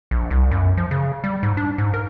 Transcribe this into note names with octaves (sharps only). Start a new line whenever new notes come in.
A#1
C2
F#2
F3
C#3
G3
G#2
D4
G#2
A#4